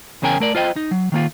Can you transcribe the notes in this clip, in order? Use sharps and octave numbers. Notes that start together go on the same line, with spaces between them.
E2 C#3 C#4 A#4 G5 G#5
A3 A#4 D5
F4 C5 D#5 G5
D#4
F#3
D#3 A#3 F4